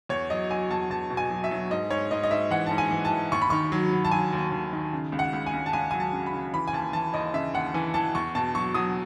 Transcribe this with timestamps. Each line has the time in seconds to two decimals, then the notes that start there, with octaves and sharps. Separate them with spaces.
0.09 E2 C#5
0.30 F#3 D#5
0.50 F#3 G#5
0.70 E2 A5
0.90 E2 A5
1.10 B2
1.17 G#5
1.30 F#3
1.44 E5
1.51 F#3
1.71 G#2 D#5
1.90 G#2 C#5
2.11 G#2 D#5
2.23 D#5
2.31 G#2 E5
2.51 E3 F#5
2.66 G#2 A5
2.78 G#5
2.91 E3
3.05 A5
3.11 E3
3.32 D#2 C#6
3.42 B5
3.50 D#3 C#6
3.72 F#3
3.93 F#3
4.05 A5
4.11 F#3 G#5
4.33 D#2
4.52 D#2
4.73 D#3
4.93 C#3
5.12 C#2
5.19 F#5
5.33 C#2
5.46 G#5
5.53 C#2
5.66 A5
5.73 C#2 G#5
5.91 F#3 G#5
6.00 A5
6.13 C#3
6.26 B5
6.33 C#3
6.53 E3 B5
6.68 G#5
6.73 D#2 A5
6.93 E3 A5
7.14 D#2 D#5
7.34 C#3 E5
7.54 D#2 F#5
7.74 E3 G#5
7.94 E3 A5
8.15 E2 C#6
8.35 B2 A5
8.54 F#3 C#6
8.74 F#3 D#6